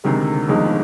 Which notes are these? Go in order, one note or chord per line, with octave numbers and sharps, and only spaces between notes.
D2 C3 D#3 G#3
G1 F2 D#3 G#3 D#4